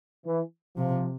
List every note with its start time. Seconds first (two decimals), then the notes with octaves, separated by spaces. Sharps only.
0.26 E3
0.77 C3 F3